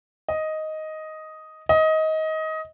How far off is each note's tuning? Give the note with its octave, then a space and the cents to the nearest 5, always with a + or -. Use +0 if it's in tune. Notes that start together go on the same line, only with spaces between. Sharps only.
D#5 +5
D#5 +20